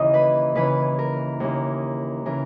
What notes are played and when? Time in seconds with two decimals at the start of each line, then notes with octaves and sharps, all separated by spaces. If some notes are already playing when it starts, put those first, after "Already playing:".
Already playing: D#2 C#3 E3 D#5
0.14 B4
0.55 D#2 C#3 E3 B4
0.99 A#4
1.40 D#2 C#3 E3
2.25 C#3 E3 A#4